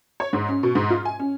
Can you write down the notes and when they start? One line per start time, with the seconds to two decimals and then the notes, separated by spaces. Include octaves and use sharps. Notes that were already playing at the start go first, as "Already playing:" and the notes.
0.20 C#5
0.33 G#2
0.48 C#4
0.63 B2
0.75 G#2
0.90 F4
1.05 G#5
1.19 C#4